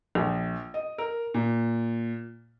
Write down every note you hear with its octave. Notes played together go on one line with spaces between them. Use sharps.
A#1
D#5
A#4
A#2